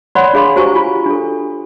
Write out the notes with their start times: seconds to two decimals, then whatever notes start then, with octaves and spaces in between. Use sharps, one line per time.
0.15 C#5 D5 F#5 B5 C6
0.34 D4 G#4 F5 B5 C6
0.56 F#4 G4 C5 G#5 A#5 C#6
0.75 F4
1.06 D4 A4